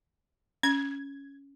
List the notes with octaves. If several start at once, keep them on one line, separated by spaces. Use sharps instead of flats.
C#4 G#6